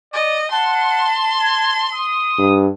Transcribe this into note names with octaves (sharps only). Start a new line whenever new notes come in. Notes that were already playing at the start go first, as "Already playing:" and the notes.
D5 D#5
F#5 A5 C6
G#6
D#6
G2